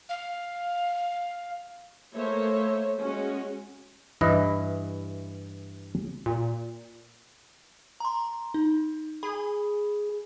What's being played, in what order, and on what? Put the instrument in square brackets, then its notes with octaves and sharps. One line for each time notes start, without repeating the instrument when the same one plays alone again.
[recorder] F5
[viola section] A3 A#3 C5 C#5 E5
G#3 C#4 F#4
[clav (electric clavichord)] G2 E3 E4 B4 D#5
[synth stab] A#2
[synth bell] A#5 C6
D#4
[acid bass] G#4 [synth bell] B5